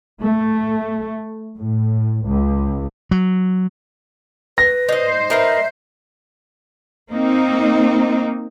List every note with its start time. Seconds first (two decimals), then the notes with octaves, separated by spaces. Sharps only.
0.22 A3
1.58 A2
2.26 C#2
3.11 F#3
4.58 B4 A#6
4.89 D#4 C5 D#5
5.30 D#4 A#4 B4 E5
7.11 A#3 C4 D#4